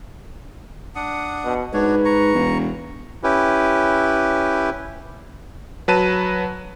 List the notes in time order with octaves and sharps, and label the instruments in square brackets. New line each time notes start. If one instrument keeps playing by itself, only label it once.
[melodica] D4 F#5 D#6
[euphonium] B2
[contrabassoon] G#2 [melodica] D4 F#4 C#5 [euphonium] B4
[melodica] A#5 C#6
[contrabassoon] E1
[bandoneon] C#4 E4 G4 B4
[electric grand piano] F#3 B4 A5 D#7